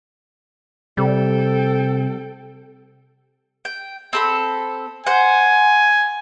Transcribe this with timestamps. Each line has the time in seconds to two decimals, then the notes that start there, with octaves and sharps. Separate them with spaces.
0.97 C3 G3 A4 G5
3.65 G5
4.13 C4 A4 B5
5.07 C5 F#5 G#5